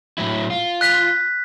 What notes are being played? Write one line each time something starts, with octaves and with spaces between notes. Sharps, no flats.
A2 F#3 E4
F4
F#6 B6